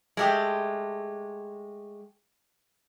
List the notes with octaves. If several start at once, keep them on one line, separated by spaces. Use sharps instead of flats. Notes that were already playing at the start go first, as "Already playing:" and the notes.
G#3 A3 G4